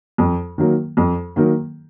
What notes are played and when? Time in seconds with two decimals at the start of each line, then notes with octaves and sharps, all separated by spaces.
0.18 F2
0.58 D#3 F#3 A#3
0.97 F2
1.36 D#3 F#3 A#3